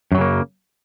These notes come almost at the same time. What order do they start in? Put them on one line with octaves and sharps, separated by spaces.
F#2 F#3 C#3 A#3